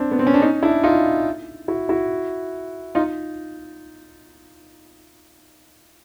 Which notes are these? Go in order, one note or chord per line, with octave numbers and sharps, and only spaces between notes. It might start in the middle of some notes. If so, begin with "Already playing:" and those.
Already playing: C4 D4
B3
C4
C#4
D4
C#4 D#4
D4 E4
D#4 F4
E4 F#4
E4 F#4
D#4 F4